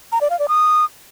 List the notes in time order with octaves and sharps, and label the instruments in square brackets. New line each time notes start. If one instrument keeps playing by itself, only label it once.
[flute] A#5
D5
F5
D5
D#6